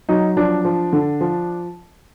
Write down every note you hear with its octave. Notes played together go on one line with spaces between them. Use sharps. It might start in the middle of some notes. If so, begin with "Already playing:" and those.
F#3 D#4
F3 D4
F3
D3
F3